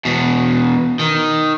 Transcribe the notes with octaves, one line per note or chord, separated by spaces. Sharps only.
E2 B2
D#3